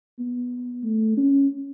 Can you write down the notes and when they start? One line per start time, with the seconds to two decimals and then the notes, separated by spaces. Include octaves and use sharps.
0.19 B3
0.84 A3
1.17 C#4